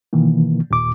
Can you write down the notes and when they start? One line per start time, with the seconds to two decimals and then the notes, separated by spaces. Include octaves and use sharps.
0.13 B2 D#3 E3 A#3
0.71 D#2 A#2 D6